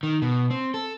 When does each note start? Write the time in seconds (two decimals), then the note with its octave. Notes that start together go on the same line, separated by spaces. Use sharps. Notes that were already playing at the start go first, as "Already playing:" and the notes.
0.03 D#3
0.22 B2
0.50 C4
0.74 A4